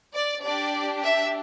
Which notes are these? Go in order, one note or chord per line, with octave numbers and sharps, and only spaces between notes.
D5
D4 G4 D5
E5